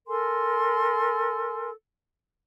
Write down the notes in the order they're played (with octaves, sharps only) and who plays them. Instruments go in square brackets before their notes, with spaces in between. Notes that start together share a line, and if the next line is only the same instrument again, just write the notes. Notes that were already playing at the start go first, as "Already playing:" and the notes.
[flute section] A4 A#4 G#5 C6